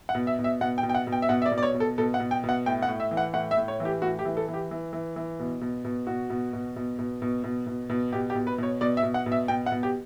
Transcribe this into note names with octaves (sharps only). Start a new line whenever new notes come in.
F#5
B2
E5
B2
E5
B2 F#5
G5
B2
G5
F#5
B2
G5
E5
B2 F#5
E5
D5
B2
D5
C#5
B2
A4
B2 A4
F#5
B2
G5
B2
F#5
A2 G5
F#5
A2
E5
E3
F#5
A2 F#5
E5
A2
C#5
E3
G4
A2 F#4
G4
E3
A4
E3
G4
E3
E3
E3
B2
B2
B2
B2 F#4
B2
B2
B2
B2
B2
B2
B2
B2
B2 G4
G4
B2
B4
B2 C#5
B2 D5
E5
B2
F#5
B2
E5
B2 G5
F#5
B2
G4